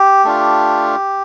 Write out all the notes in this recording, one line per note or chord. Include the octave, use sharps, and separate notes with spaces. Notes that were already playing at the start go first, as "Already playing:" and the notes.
Already playing: G4
A3 D4 F4